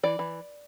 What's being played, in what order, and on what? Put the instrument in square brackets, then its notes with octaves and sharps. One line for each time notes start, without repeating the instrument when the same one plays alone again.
[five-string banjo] E3 D5
E3